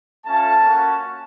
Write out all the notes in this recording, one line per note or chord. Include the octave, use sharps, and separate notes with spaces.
A3 C#4 F4 A5
A#3 C#4 F#4